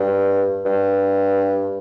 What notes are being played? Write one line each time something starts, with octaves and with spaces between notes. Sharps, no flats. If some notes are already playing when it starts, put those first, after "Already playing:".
Already playing: G2
G2